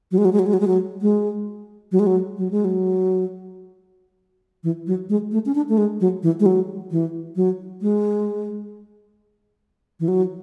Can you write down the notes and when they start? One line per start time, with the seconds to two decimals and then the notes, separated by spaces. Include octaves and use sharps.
0.11 F#3
0.18 G#3
0.25 F#3
0.33 G#3
0.39 F#3
0.46 G#3
0.53 F#3
0.60 G#3
0.67 F#3
1.01 G#3
1.92 F#3
1.99 G#3
2.07 F#3
2.38 F#3
2.51 G#3
2.65 F#3
4.64 E3
4.87 F#3
5.09 G#3
5.32 A3
5.46 C#4
5.55 D4
5.69 A3
5.78 G#3
6.00 F#3
6.23 E3
6.40 G#3
6.46 F#3
6.91 E3
7.36 F#3
7.81 G#3
10.00 E3
10.08 F#3